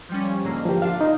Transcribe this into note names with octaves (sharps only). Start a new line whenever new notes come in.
F3 G3 C#4
G#2 D3 A#3
F3 G4
D4 F4 F5
D#4